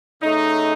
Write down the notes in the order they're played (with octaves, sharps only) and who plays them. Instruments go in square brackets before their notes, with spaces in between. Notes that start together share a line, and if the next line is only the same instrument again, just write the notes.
[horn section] C#3 A3 C#4 D#4